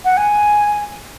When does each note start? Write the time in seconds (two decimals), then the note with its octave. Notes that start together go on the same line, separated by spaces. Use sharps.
0.04 F#5
0.17 G#5